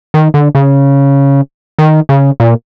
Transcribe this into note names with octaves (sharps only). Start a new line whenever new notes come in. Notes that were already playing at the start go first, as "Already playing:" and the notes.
D#3
D3
C#3
D#3
C#3
A#2